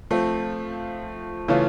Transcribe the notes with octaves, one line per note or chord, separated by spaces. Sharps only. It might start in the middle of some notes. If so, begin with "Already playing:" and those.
F3 A3 C4
C#3 E3 A3 C#4 F4